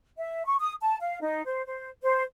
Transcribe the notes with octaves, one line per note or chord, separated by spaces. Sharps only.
E5
C#6
D#6
A5
F5
D#4
C5
C5
C5